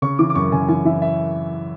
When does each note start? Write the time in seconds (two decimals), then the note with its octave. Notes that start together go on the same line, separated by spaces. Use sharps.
0.02 C#3 C#6
0.19 E3 D6
0.30 D6
0.35 F#2 C#6
0.52 C#3 G#5
0.69 E3 G#5
0.85 E3 E5
1.02 E5